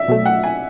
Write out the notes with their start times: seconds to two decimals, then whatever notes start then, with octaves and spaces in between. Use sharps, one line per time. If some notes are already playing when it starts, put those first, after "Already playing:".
Already playing: D5 E5
0.08 B2 F#3 A3
0.25 F#5
0.43 G#5